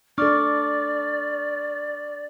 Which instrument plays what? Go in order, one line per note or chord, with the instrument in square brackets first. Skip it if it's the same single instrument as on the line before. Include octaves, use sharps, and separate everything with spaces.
[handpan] D4 A4 [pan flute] D5 [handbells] C#6 D6 F6